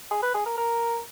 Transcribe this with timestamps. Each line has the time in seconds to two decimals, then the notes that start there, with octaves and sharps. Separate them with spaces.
0.11 G#4
0.23 B4
0.34 G#4
0.46 A#4
0.57 A#4